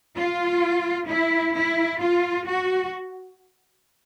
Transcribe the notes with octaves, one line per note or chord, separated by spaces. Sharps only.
F4
E4
E4
F4
F#4